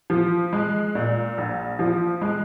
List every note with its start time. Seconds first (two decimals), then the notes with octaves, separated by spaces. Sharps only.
0.10 F3
0.53 G#3
0.95 A#2
1.38 A#1
1.79 F3
2.21 G#3